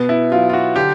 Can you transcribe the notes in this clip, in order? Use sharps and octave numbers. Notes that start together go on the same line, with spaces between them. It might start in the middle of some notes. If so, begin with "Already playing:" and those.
Already playing: B2 B3
E4
F#3 F4
F4
F#4
D3 G4